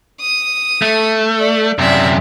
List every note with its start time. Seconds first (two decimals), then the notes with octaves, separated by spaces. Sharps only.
0.20 D#6
0.82 A3
1.39 D5
1.79 F#2 C3 D5 E5